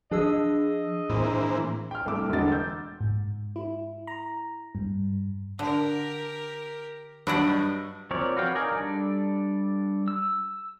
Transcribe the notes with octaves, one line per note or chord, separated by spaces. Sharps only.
F3 D4 G#4 D#5 E6
A2 E3 A#3 C4
G5 F6
G1 C2 A3 G5 D6 E6
E1 D3 F#4 D#5 A6
E6 G6
G#2
E4
A#5
G2
D3 G4 A#4
G2 F#3 D4 D#5 F#5 B5 D7
F3 C4 A#4 C#5 D5
F#4 B4 C#5 F5 G5
D#4 A#4 D5 G#5
G3 D4 A4 D5
E6